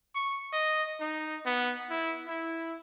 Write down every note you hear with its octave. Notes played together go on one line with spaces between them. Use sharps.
C#6
D#5
D#4
B3
E4
E4